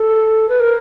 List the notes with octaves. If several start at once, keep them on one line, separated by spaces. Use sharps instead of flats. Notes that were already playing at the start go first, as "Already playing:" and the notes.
Already playing: A4
B4
A#4